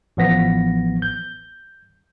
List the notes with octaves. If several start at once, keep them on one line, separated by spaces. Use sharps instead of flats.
A1 F3 B3 A#6 B6
G6